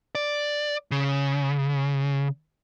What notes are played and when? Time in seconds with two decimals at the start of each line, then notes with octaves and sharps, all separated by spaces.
0.15 D5
0.91 C#3